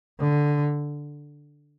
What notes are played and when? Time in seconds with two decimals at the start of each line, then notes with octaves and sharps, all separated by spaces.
0.19 D3